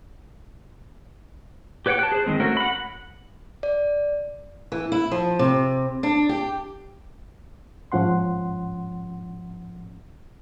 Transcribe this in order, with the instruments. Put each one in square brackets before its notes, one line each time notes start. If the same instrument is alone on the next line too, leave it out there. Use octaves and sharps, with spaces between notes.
[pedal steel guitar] G4 B4 C#5 F#5 G5
A5 F#6
G#4 C5
D#3 F3 G#3 C4
A3 C#4 F#4 A#4
F#5 B5
[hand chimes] D5
[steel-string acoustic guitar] E3
E4
F3
C3
D4
G4
[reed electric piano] G#2 F3 C#4 F#5 C6